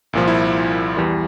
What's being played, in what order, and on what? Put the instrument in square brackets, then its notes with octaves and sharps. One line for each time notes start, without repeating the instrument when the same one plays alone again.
[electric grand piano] C2 A#2 F3
E4
E2 E3 G3